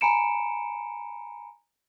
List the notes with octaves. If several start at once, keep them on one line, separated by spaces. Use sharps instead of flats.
G#5 A#5 B5 C#7 D7 E7